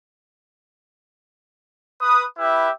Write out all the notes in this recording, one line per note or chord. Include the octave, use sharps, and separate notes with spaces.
B4 D#6
E4 G4 B4 E5